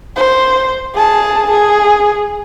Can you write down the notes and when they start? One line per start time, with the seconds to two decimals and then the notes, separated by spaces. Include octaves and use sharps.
0.16 C5
0.95 G#4 A5
1.51 G#4